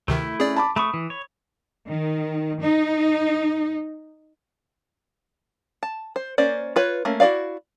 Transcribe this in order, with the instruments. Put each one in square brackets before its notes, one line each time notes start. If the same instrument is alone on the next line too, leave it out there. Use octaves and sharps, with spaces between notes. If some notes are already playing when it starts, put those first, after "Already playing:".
[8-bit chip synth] D2 C3 D#3 [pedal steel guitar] A3 E4
[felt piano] C#4 [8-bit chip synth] G#4 D5
[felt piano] A5 B5 D6
[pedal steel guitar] A3 C#6 [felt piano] B5 D#6
[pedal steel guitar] E3
C#5
[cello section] D#3
D#4
[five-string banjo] A5
C5
A#3 C#4 C5 D5
F4 B4 C#5
A3 A#3 C#4
E4 F#4 B4 D5 F5